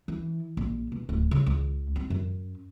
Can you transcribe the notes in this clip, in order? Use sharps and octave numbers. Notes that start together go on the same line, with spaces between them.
E3
A#1
B2
D1
C#3
C#2
C4
F#2